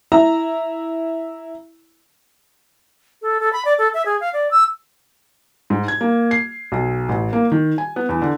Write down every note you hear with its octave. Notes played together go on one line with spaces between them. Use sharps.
E4 A#5
A4
A4
B5
D5
A4
E5
G#4
F5
D5
E6
G#2
G#6
A#3
C7
B1
A1
A#3
D#3
G#5
B3
E2
D3